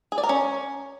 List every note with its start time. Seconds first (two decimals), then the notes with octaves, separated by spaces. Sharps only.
0.12 G#4
0.18 D5
0.23 A#4
0.29 C#4